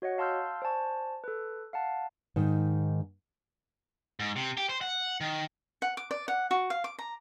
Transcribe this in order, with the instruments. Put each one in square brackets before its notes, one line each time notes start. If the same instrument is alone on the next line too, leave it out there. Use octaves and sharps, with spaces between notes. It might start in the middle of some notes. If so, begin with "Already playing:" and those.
[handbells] F#4 C#5 D#5 F#5
F5 A5 C6 E6 F6 G6
C5 D5 G#5 A5 C#6
A4 B4
F5 F#5 A5
[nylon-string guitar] G#2 D#3
[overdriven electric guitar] G#2
C3
G4
C5
F#5
D#3
[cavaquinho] F#5
D6
D5
F#5
F#4
F5
D6
A#5